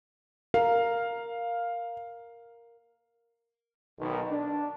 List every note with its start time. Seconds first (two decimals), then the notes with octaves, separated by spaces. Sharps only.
0.54 A#4 F5
3.99 B1 D#3
4.30 D4